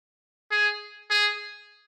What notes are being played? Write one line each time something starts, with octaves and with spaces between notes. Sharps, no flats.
G#4
G#4